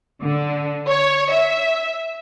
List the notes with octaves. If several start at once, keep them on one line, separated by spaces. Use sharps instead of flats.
D3
C#5
E5